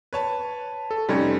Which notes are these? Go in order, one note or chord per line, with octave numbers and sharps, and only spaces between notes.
B4 C#5 A5
A4
F1 G3 C4 C#4 D#4